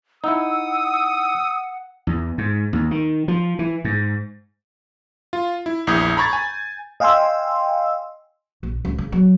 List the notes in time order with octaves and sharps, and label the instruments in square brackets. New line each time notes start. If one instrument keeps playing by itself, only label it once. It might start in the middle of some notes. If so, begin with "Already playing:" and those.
[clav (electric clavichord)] D#4 E4 [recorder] F#5 [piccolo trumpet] D#6 [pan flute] E6
[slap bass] E2
G#2
D#2
D#3
F3
E3
G#2
[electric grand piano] F4
E4
A#1 E2 E4 D#6 G6 G#6
A#5 B5 C#6 G#6 A6
G#5
[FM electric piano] D#5 F5 G5 G#5 C6 E6
[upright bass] A#1
C#2
C#3
F#3